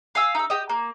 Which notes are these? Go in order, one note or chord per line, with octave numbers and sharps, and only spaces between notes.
F5 G#5 E6
D#4 E5
G4 D#5
A#3